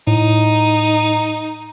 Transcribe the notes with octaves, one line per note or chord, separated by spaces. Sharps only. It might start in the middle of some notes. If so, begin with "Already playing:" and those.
A2 D#4